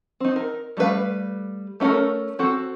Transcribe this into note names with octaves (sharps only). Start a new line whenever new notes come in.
C4 D#4
A#4
G3 A3 D#4 B4 F5
A3 C#4 F4 A4 A#4
C4 F#4 A4